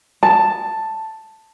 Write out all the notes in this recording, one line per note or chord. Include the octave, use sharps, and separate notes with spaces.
A5